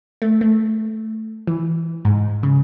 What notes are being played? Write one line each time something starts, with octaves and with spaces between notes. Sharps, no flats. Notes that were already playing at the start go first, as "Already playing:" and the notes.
A3
A3
E3
G#2
C#3